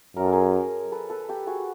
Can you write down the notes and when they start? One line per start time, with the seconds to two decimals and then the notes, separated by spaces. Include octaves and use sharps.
0.16 F#2 A#4
0.25 A4
0.33 G#4 A#4
0.92 A4 B4
1.10 A4 B4
1.29 G4 A4
1.47 F#4 G#4